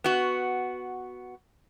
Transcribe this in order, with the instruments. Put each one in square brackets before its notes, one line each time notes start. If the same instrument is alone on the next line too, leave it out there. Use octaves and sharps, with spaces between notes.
[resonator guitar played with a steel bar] B3 F#4